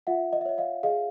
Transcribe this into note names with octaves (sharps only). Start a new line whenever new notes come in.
F4 E5 F#5
D#5
E5
C#5 D#5
D#5 F5
G#4 D#5 F5